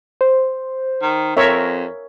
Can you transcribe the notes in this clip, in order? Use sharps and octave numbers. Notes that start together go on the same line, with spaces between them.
C5
D#3
F2 A#4 C#5 E5